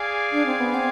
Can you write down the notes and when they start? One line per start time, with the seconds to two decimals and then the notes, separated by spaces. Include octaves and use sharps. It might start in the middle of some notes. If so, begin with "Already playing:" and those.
Already playing: G#4 D5 F5 G#5
0.32 D4
0.46 C4
0.60 B3
0.74 C4